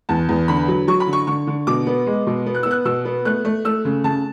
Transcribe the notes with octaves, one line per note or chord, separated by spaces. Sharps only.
E2 A5
E2
D3 B5
F#3
F#3 C#6
B5
D3
C#6
D3 C#6
D3
B2 D6
B3
G#3
B2
B3
F#6
B3 E6
F#6
B2 E6
B3
A3 F#6
A3
A3 E6
C#3
C#3 A5